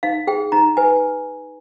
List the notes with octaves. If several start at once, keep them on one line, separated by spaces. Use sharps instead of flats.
D#4 F5
G#4 G5
D#4 A#5
B4 G#5